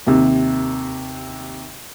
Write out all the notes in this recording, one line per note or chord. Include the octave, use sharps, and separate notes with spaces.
D#2 C3